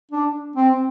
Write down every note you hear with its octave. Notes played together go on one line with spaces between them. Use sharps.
D4
C4